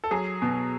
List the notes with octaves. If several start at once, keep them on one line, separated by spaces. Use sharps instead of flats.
A4
F#3 G#4
B2